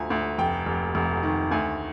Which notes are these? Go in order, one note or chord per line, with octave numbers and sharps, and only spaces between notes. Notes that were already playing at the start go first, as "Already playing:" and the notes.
Already playing: D2 F3 G#5 A#5
D2
F1 G5
F1
F1
D#3
D2 G#5